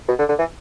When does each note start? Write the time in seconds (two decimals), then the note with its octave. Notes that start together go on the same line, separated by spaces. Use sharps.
0.08 B2
0.19 D3
0.29 D3
0.39 E3